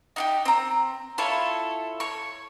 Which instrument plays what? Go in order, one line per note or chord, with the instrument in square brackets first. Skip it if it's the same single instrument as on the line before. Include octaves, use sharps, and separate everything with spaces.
[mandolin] D#4 F4 G4
C4 A#5
E4 F4 A4 C#5
C#5 C#6